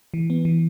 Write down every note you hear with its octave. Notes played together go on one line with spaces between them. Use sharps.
E3
B3
E3